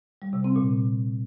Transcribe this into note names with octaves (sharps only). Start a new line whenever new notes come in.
G3
C3
C4
A#2